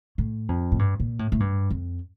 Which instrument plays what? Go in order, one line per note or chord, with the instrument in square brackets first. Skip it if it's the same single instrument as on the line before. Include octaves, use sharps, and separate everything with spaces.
[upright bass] A2
F2
A2
G2
A#2
A2
A2
G2
F2